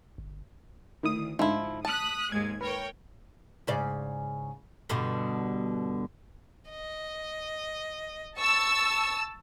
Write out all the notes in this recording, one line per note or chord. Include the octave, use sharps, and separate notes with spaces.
G1
D2 D#3 E4 D#6
G#2 D3 F3 G#3 D#4 E4
A5 D#6 F#6 B6
D#2 G#2 G#3 G#6
A#4 B4 C#5 G5
G#2 C#3 D5
G2 B2 D3
D#5
A5 C#6 E6